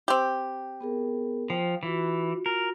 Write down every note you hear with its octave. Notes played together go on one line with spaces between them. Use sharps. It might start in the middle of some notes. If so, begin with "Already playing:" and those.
C4 G4
B3 G#4 A#4
F3 G5
E3 F4 F#4
A#4